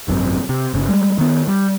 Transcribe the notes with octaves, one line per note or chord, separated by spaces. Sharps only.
G#1 F#2 A2 C3
C3
G1 C#3
G3 G#3
D#3 B3
G3